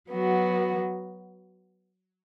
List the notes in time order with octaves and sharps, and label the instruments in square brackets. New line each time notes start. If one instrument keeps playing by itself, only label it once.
[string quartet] F#3 B3 F#4